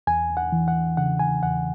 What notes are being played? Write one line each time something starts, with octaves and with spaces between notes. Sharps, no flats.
E2 G#5
F#5
E3
F#5
C#3 F#5
G#5
E2 F#5